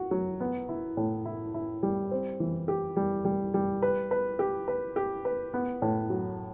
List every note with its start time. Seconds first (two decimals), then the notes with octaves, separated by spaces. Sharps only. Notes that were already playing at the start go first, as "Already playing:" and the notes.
Already playing: F#4
0.11 F#3
0.40 B3
0.69 E4
0.97 A2
1.26 E4
1.54 E4
1.83 G3
2.11 C4
2.40 E3
2.68 G4
2.96 G3
3.25 G3
3.54 G3
3.82 B4
4.11 B4
4.39 G4
4.68 B4
4.96 G4
5.25 B4
5.54 B3
5.82 A2
6.10 F#3